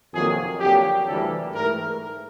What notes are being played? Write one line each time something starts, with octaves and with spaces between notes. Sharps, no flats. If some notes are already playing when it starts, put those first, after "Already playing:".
F2 C3 D#3 F#3 A#3 G#4
F2 D3 F#3 A#3 G4
D2 C3 E3 G3 A#3 A4
G#2 E3 A3 A#4